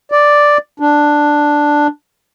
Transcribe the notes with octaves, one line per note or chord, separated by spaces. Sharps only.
D5
D4